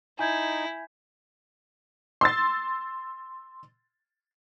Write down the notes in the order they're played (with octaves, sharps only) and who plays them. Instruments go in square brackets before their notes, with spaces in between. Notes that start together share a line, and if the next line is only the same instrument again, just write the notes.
[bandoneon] D#4 [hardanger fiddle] E4 [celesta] G#5 G6 G#6
[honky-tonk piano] C6 E6 A6